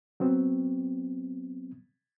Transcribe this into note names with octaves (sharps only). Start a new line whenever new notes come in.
F#3 B3 C4